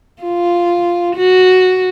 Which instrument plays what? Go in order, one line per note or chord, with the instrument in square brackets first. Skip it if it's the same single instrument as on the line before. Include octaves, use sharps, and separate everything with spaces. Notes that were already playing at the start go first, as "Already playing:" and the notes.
[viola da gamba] F4
F#4